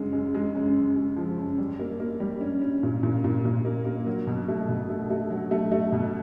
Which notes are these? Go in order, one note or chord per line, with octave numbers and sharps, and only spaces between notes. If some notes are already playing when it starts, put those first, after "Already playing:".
Already playing: F#2 C#3 G#3
G#3
G#3
F#2
F#2
G#3
F3
F#2
G3
A#3
A#3
G3
C#4
C#4
A#2
A#2
A#2
A#2
A#3
A#3
F#3
B2
A3
B2
A3
A3
F#3
A3
A3
B2